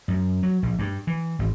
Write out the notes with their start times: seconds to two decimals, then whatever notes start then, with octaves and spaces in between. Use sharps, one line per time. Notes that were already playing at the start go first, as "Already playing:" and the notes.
0.08 F#2
0.43 F#3
0.63 A#1
0.79 G2
1.07 E3
1.39 G#1